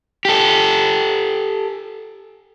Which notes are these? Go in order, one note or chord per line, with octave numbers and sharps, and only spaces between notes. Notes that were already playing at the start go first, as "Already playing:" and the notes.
G4 A4